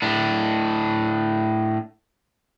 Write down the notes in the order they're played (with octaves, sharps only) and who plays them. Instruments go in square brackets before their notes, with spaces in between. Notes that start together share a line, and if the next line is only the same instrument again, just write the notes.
[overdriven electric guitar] A2 D4